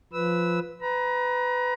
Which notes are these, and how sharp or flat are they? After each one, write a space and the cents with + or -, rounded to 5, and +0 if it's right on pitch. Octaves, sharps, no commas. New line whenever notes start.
F3 +0 B4 +0 E6 -15
B4 +20 A#5 +30